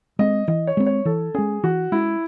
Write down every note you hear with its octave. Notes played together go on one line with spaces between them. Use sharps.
G#3 C4 D#5
E3 D#5
C#5
G#3 C4
C#5
E3 A4
G#3 C#4 G#4
E3 F#4
G#3 C#4 E4